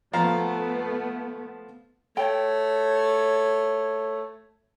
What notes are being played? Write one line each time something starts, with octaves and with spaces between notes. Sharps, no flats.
F3 A3 B3 F5 A#5
A3 C#5 G5